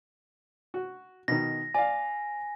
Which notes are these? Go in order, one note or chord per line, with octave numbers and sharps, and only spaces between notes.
F#4
B2 D#3 A#6
D5 F5 G#5